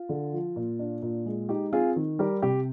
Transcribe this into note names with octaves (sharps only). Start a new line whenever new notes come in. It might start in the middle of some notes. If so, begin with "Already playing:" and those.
Already playing: F4
D3
F3
A#2
D4
A#2
G#3
D#4 G4
C4 F4 G#4
D#3
G3 G4 A#4
C3 G4